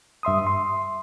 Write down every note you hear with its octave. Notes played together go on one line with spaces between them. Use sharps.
G2 E5 C6 D#6
C6